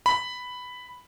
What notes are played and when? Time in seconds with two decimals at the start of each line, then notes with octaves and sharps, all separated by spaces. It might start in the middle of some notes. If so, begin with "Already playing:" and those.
0.06 B5